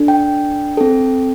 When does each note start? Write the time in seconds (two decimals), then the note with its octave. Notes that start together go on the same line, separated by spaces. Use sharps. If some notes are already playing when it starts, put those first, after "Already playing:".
Already playing: D4 A4
0.08 G5
0.77 C4 A4